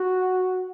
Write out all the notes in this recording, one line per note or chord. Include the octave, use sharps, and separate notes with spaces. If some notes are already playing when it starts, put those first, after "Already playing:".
Already playing: F#4